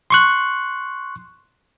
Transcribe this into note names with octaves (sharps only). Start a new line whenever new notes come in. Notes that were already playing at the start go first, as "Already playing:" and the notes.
C6 C#6 F#6